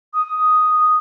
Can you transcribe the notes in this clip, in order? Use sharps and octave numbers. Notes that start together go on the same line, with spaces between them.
D#6